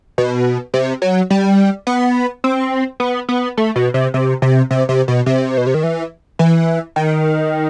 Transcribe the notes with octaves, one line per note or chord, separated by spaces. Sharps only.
B2
C3
F#3
G3
B3
C4
B3
B3
A3
B2
C3
C3
C3
C3
C3
B2
C3
B2
C3
D#3
E3
E3
D#3